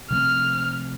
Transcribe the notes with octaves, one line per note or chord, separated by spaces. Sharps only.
C3 F3 A3 C4 F6